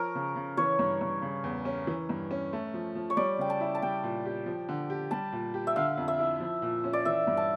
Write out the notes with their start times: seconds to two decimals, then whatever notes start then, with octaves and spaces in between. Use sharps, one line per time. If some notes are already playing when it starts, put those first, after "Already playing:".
Already playing: F3 A#4 C#5
0.15 C#3
0.36 C#3
0.57 E3 C#5
0.79 G2
1.01 G2
1.22 C#3
1.44 E2
1.65 C#4
1.87 E3
2.09 G2
2.31 C#4
2.53 A3
2.74 F3
2.95 F3
3.10 C#5
3.17 G3 D5
3.38 C#3 G5
3.50 A5
3.61 E4
3.75 A5
3.82 G3 G5
4.03 A#2
4.25 G4
4.46 F3
4.69 D3
4.90 G4
5.11 G3 A5
5.32 A#2
5.54 G4
5.67 E5
5.76 D3 F5
5.98 F2
6.08 E5
6.19 E4
6.40 F3
6.62 A#2
6.84 C#4
6.93 D5
7.05 E3 E5
7.27 G2
7.37 A5